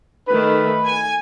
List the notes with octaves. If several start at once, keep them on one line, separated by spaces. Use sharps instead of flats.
D#3 A3 B4
G#5